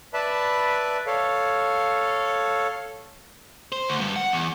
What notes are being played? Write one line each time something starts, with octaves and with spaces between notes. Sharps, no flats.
B4 D5 E5 A5 B5
A4 C#5 F5
C5
D2
G2
F#5
E2